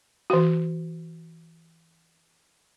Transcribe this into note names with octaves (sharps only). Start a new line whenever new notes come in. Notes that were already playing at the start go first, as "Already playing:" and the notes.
E3 F#4